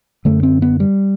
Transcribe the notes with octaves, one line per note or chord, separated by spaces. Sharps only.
F#2 D3 A3
C4
B3
G3